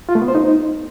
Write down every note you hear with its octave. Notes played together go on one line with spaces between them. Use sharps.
F4
A3
B3
C5
D#4